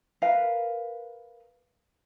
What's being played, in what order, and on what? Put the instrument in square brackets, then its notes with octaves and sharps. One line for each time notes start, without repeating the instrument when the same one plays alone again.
[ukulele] A#4 B4 F5